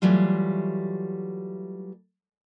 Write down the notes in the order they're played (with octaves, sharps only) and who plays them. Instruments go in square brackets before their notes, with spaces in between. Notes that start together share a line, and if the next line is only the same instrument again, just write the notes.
[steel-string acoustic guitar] E3 F#3 G3 A3 F4